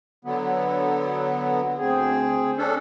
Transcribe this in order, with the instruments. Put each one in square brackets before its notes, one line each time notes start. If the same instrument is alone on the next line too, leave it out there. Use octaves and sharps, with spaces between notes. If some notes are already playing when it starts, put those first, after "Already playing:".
[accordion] D3 F#3 B3
[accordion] D2 [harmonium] C4 G#4
[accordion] C#4 D4 A4